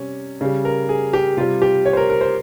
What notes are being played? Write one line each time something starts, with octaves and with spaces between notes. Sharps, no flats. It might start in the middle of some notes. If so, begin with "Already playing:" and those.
Already playing: C3 G3 C#4
C#3 G3
A#4
G#4
G4
C3 G3 F4
G4
C#5
C5
A#4
A#4
C5